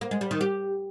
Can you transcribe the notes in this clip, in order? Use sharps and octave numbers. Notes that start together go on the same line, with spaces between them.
A#3
G#3
G3
D#3
G4